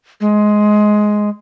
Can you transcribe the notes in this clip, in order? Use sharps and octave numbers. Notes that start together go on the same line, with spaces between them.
G#3